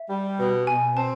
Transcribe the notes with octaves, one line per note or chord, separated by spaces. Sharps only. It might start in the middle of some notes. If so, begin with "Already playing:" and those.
Already playing: E5
G3
B2
B2 G#5
C4 A5